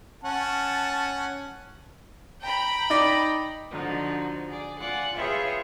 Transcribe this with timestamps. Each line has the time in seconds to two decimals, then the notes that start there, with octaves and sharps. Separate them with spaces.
0.24 C#4 F#5 A5
2.41 G5 A#5 B5
2.90 D#4 D5
3.70 D3 F3 D#4 F#4
4.50 G#4 D5
4.80 F4 D5 F#5 G#5
5.16 F4 G#4 B4 C#5 E5 G5